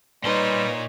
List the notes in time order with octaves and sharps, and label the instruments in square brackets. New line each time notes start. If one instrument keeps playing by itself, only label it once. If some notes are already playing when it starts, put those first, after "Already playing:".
[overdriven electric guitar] A#2 C6 [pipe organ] G3 [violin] D#4 C#5 [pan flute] B4